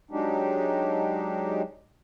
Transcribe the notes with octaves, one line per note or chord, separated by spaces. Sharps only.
F#3 G#3 D4 D#4 G4